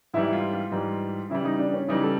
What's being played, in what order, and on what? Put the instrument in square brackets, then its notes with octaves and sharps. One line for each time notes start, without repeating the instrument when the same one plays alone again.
[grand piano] G#2 E3 G3 [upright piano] E4
[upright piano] F4
F4
[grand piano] G#2 E3 G3
[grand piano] C#3 E3 G3 [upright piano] E4
[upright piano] D#4
D4
C#4
[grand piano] C#3 E3 G3 [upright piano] D#4
[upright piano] A4